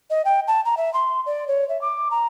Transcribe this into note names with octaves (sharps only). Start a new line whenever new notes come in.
D#5
G5
A5
A#5
E5
C6
D5
C#5
E5
D6
A#5